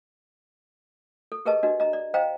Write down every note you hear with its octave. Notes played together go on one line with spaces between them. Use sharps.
A4
G4 G#4 A#4 B4 D#5 A5
D4 F#4 D#5
D#5 A#5
D5
C5 D#5 F5 G5 A#5